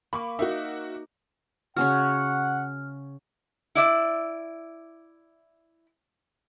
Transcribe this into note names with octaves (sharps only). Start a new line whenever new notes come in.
A#3 B5 C#6 D6
D#4 F#4 A#4 E5
C#3 C#4 F#4 F#5 F6
E4 D5 E5